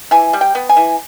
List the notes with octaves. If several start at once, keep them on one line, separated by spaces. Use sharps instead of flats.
E3 G#5
G3
G5
B3
G#5
E3